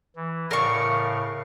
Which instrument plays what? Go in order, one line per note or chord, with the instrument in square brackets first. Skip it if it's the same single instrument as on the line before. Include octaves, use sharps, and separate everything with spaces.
[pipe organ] E3
[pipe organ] A2 C#3 F5 [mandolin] A#4 D5 C#6